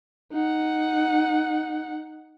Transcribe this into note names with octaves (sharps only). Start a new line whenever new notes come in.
D#4 F#5